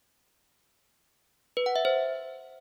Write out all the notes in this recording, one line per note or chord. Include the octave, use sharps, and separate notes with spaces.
B4
F#5
E5
C5